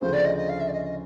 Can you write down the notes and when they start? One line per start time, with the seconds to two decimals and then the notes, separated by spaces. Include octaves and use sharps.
0.01 D2 C#3 F3 C5
0.13 D5
0.25 D#5
0.37 D#5
0.49 F5
0.60 E5
0.68 D5
0.72 D#5
0.84 D#5